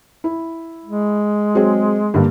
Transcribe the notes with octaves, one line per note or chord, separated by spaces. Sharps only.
E4
G#3
F#3 C4 G#4
G2 D3 A#3